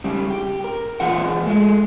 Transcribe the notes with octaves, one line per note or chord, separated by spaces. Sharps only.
C#3 G3
G4
A#4
A#2 E3 F4 G#4 F#5
G#3 A3